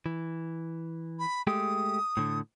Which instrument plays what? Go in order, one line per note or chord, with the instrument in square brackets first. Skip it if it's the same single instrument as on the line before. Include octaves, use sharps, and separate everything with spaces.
[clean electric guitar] E3
[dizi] B5
[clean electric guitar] G#3 A3 G4 [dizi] D#6
[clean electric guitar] A2 D3